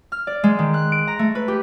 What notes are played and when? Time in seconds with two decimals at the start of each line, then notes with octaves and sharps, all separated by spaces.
0.12 F6
0.27 D5
0.44 G#3
0.59 D#3
0.74 F#6
0.92 D7
1.07 A#5
1.19 A3
1.35 B4
1.48 G4